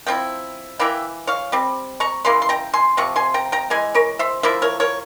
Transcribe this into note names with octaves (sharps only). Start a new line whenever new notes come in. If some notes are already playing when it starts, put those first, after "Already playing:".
F3 C4 E4 G5
E3 A#3 E4 E5 G5
C#5 F5
G3 C4
A#5 C#6
C#3 E3 A#3 C6
C6
G5 A#5
G#5 C6
C3 F3 C4 C#6
G#5 C6
G5 A#5
G5 A#5
E3 G#3 G#5
A#4 C#5
C5 E5
F3 A#3 E4 C5 E5
A#4 C#5
A#4 C#5